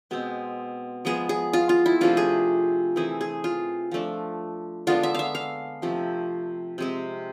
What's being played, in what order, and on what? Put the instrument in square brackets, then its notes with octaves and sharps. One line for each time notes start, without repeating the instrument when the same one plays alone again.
[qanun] B2 G#3 C4
F3 G#3 B3 G#4
G#4
F4
F4
E4
C3 F3 A3 D4 F4
G#4
E3 A3 C4 G#4
G#4
F4
F3 A3 D4
D3 G#3 B3 D4 F4
E5
E5 F5
F5
C3 F3 A3
C3 G#3 C4